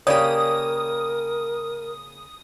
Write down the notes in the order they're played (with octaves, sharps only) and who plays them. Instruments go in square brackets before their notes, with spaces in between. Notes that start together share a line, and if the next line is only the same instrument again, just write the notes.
[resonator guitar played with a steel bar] C#3 A#3 G4 [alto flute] A#4 [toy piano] C#5 D5 [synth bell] D#6